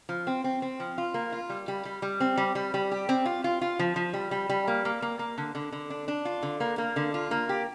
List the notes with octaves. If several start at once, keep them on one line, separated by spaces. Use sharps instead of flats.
F3
C4
C4
C4
F3
F4
A#3
F4
G3
G3
G3
G3
C4
G3
G3
G3
G4
C4
F4
F4
F4
F3
F3
G3
G3
G3
A#3
A#3
A#3
A#3
D3
D3
D3
D4
D4
F4
D3
A#3
A#3
D3
F4
A#3
G4